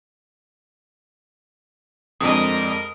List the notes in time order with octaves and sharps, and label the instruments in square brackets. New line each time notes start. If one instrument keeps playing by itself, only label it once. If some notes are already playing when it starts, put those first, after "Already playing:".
[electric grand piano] F2 D3 G#3 [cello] A#4 D#5 [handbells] D#6